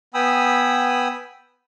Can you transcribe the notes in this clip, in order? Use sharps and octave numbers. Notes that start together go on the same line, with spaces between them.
B3 G5 G#5 B5 D#6 E6